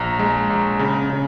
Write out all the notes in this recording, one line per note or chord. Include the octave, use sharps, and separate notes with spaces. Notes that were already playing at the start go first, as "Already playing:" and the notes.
Already playing: A#1 A#5
G#3
A#1
C#3
C#3